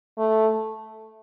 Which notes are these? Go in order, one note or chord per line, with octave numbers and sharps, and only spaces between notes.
A3